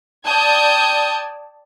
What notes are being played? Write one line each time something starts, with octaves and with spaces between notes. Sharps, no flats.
D5 G5 A5 D#6 G6 G#6